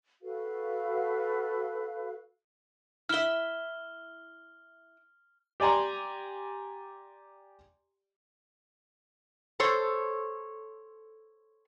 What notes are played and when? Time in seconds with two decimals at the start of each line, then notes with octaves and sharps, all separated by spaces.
0.22 F#4 A4 B4 F5
3.09 E4 E5 F6 G7
5.60 G4 D5 G#5 A#5 C6
9.60 A4 C5 C#5